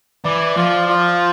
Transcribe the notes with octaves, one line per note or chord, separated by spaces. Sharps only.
E3 D5
F3 F4
F4